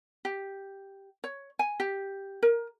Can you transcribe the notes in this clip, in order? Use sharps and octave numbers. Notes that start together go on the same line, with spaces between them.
G4
C#5
G#5
G4
A#4